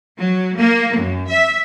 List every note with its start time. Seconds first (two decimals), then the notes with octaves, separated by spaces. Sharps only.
0.19 F#3
0.57 A#3
0.93 F#2
1.28 E5